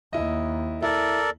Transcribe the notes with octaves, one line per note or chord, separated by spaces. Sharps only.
D#2 E4 D#5
E4 A4 A#4 D5